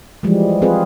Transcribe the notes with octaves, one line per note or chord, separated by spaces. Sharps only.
E3 F3 G3 G#3
C4 F4 G#4 B4